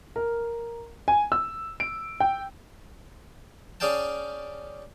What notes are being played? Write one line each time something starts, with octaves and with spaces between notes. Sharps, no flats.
A#4
G#5
E6
D7
G5
C#4 G#4 D5 F5 G5 A5